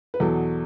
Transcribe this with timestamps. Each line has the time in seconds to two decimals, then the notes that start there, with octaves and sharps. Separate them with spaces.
0.14 B4
0.20 E2 B2 F#3 A4